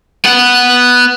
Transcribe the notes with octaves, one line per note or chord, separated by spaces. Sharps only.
B3 F#5